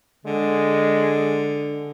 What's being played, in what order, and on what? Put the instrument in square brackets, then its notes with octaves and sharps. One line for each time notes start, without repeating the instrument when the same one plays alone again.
[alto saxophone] D3 [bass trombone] G#3